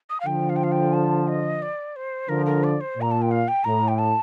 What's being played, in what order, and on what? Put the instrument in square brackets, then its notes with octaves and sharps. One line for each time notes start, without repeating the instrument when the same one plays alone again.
[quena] D#6
F5
[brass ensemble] D3 F3 [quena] G5
[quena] F5
G5
F5
G5
A5
D#5
D5
C5
[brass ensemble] D3 F3 [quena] A#4
[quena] A#4
D5
C5
[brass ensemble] A#2 [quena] A#5
[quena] A5
G5
F5
G5
[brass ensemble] A2 [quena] A#5
[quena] G5
A5